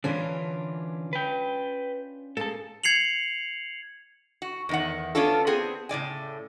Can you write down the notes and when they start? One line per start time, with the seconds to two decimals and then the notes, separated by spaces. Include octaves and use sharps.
0.04 D3 E3 C#4 D4 F4
1.13 B4 G5
2.37 A#3 G#4 A4 A5
2.84 G#6 C7 C#7 F7 F#7
4.42 F#4
4.69 E2 D#3 F#5
5.15 B3 C#4 D4 F4 A4
5.47 B3 C4 G#4
5.89 A2 C#3 D5 G#5